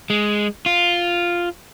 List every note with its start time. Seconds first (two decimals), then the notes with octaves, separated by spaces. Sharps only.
0.10 G#3
0.66 F4